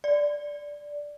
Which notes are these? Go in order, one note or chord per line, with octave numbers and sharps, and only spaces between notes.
D5